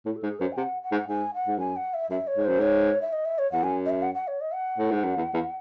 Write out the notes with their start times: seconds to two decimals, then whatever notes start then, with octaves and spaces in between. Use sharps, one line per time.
0.05 A2 E4
0.16 A4
0.23 G#2 G#4
0.40 F#2 C5
0.52 G#5
0.57 C3 F#5
0.83 F#5
0.92 G#2
1.08 G#2 G#5
1.34 F#5
1.47 G#2
1.59 F#2 G#5
1.76 F#5
1.94 E5
2.10 F#2 E5
2.27 C#5
2.37 G#2
2.45 F#2 C5
2.59 G#2 C#5
3.02 E5
3.13 D#5
3.25 E5
3.39 C#5
3.52 E2 F#5
3.64 F#2 G#5
3.86 D#5
3.90 E5
4.02 F#5
4.15 F#5
4.28 C#5
4.41 D#5
4.53 F#5
4.78 A2
4.91 G#2
5.05 F#2
5.17 E2
5.34 E2